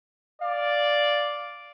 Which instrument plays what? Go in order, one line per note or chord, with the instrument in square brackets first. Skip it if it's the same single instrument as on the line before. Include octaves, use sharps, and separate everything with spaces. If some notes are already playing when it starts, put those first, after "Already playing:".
[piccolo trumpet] D5 [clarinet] F5